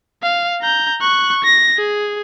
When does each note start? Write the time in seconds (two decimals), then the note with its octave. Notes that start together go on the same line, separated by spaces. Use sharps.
0.22 F5
0.62 A#5 G6
1.01 C#6 F#6
1.44 A#6
1.77 G#4